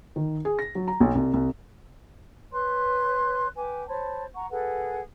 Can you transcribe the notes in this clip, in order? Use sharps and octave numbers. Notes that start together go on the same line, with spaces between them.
D#3
G#4
A#6
F#3
A#5
B1
C2
C2
B4 C#5 C6 F#6
B4 G5 G#5 D6
C5 C#5 A5 B5
F#5 A#5 C#6
G#4 A4 B4 F#5